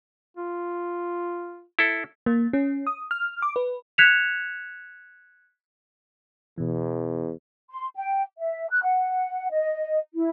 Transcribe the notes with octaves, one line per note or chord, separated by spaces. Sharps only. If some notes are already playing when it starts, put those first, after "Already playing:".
F4
E4 A4
A#3
C#4
D#6
F6
D6
B4
F#6 G#6 B6 C#7 E7 F7
E2 B2 E3
C6
G5
E5
F#6
F#5
D#5
E4